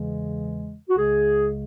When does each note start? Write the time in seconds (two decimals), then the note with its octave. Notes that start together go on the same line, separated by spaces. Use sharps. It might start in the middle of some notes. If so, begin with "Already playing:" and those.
Already playing: E2 C#3 E3 G#3
0.90 F#4
0.98 C#2 C#3 G#3 G#4